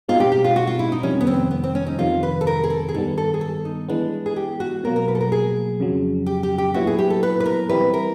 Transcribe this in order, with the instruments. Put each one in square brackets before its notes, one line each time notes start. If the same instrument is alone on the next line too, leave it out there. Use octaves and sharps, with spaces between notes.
[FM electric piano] B2 G#3 C4 D#4 [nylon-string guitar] F4
[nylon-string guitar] G4
G4
F4
F#4
F4
E4
D#4
[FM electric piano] F2 C3 D#3 G3 [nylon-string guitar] C#4
[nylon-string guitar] B3
C4
B3
C4
C#4
D#4
[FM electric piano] F2 C3 D#3 [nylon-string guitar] F4
[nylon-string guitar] B4
A4
A#4
G#4
A4
G#4
[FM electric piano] G2 D#3 G3 B3 [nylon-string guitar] A4
[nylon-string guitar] A4
G#4
A4
D#4
[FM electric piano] E3 G#3 B3 [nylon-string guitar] D4
[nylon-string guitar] G#4
G4
F#4
[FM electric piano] B2 F#3 A#3 [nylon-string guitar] A#4
[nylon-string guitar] A#4
B4
A4
A#4
G#4
[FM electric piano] F2 C#3 F#3
[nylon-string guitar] G4
G4
G4
[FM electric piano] A#2 F#3 B3 E4 [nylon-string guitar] F#4
[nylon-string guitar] G#4
G4
A4
B4
B4
A#4
[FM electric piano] E3 G3 C4 E4 [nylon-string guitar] B4
[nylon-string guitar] A#4